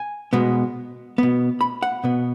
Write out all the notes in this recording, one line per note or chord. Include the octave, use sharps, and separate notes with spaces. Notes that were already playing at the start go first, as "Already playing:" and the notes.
Already playing: G#5
B2 G#3 B3
B2 B3
B5
F#5
B2 B3